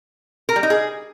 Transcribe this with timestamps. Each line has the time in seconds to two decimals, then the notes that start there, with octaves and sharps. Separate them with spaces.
0.49 A#4
0.56 G3
0.63 D#4
0.70 G#4